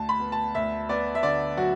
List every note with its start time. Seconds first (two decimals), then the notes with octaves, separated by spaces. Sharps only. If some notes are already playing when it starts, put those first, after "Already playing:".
Already playing: D2 A5
0.09 B5
0.20 B3
0.32 A5
0.55 D2 E5
0.89 B3 D5
1.15 E5
1.23 D3 D5
1.57 F#3 F#4